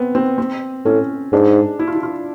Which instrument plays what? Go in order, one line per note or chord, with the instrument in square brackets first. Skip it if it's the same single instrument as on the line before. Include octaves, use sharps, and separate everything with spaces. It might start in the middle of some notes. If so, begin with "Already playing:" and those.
Already playing: [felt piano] B3 C4
C4
C4
[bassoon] A2 [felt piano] C#4
[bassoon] G#2 [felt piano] D4
[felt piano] E4
F4
E4
F4